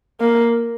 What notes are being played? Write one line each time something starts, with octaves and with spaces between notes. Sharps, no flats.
A#3